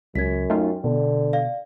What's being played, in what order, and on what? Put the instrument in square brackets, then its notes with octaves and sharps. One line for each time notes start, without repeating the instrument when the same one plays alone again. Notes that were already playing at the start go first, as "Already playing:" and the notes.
[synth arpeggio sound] C#2 [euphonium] F#2 [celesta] G#6 B6
[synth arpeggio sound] A3 D#4 F4 [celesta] G5
[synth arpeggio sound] B2 [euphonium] D3
[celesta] D5 F5